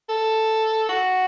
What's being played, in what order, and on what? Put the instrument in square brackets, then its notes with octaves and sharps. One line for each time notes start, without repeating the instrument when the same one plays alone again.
[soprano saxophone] A4
F#4